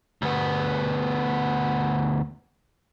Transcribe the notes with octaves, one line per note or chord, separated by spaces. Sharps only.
D2 B3